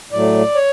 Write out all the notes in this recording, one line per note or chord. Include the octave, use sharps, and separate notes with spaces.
A2 F#3 A3 D5
C#5